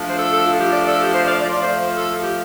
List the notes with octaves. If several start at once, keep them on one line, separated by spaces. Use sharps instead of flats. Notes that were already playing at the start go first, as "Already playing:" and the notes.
Already playing: F3 A3 D4
C5
A4
A4
F4
G4
D5
A4
G4
C5
D5
F5
F3 A3 F4 D5
D5
C5
C5
A4
F4
G4